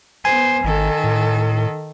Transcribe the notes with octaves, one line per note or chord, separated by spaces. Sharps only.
B3 C5 G#5
G#1 D#3 A4
A2